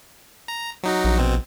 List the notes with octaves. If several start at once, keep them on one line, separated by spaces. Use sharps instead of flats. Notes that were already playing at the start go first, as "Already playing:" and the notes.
A#5
F#3 D#4 F#4
A#1
B2 C4